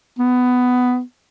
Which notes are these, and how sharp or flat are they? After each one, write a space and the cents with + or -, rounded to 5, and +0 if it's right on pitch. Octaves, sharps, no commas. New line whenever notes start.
B3 +15